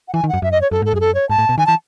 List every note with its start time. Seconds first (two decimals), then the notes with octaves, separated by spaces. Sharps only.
0.08 F#5
0.14 E3 G#5
0.24 D#3
0.29 F#2 F#5
0.42 F#2 E5
0.52 D#5
0.62 C#5
0.71 F#2 A4
0.82 G#2 A4
0.93 F#2 G#4
1.00 A4
1.15 C#5
1.29 G#2 A5
1.38 A2
1.49 B2
1.58 D#3 G#5
1.66 E3 A5